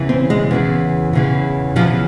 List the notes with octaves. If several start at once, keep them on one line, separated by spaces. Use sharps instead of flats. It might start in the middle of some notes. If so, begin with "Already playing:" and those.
Already playing: E2 C#3 E3
C4
G#3
E2 C#3 E3
E2 C#3 E3
E2 C#3 E3 F3